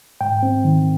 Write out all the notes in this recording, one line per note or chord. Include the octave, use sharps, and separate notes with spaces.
G#2 G5
C4
D#3